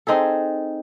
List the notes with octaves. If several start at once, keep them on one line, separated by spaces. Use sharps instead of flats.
C4 D#4 G#4 A4